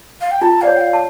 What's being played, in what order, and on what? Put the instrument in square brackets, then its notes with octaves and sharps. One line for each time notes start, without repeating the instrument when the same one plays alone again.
[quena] F5
G5
[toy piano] F4 [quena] A5
[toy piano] D5 [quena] F5
[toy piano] C#5
[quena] G5
F5
[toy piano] A5